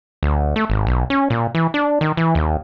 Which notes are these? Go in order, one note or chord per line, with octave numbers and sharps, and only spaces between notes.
D2
A3
G#1
B1
C#4
A#2
E3
D4
D#3
E3
D#2